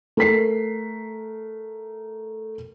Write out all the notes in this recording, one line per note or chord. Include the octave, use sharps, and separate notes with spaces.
A3 A#4 B6 C7